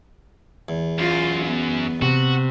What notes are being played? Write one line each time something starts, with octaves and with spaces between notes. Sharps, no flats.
E2
F#2 F4
B3
C3 F#4